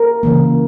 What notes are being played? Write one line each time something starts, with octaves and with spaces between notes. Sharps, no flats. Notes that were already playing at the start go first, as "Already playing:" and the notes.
Already playing: A#4
C#3 E3 A#3